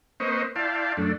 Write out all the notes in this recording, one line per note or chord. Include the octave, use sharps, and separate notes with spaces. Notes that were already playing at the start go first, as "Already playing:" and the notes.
A#3 C4 B4 C5 D#5 C#6
E4 D5 F5 G5 A5 C6
F#2 A3 D4